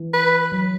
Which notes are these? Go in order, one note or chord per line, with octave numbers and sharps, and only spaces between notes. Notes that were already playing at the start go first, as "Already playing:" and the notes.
Already playing: E3
B4
F#3